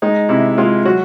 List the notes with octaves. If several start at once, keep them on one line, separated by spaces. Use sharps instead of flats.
G#3 D#4
C3 E4
G#3 F4
F#3 F#4